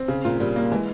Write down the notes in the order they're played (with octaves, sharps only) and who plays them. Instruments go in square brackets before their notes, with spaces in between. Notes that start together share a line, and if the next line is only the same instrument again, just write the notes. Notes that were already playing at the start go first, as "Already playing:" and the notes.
Already playing: [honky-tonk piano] C4
C#3
[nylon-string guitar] A#2 [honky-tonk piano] F4
[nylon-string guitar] A#2 [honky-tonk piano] G3
[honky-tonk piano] A#3
[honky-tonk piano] E3 [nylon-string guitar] G#3